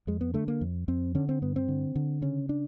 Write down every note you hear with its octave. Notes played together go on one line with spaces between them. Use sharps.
F2 G#3
B3
D3 A3
A#3
F2
F2 C4
D3 C#4
C4
G2 B3
C4
D3
D3
C#3 C#4
D4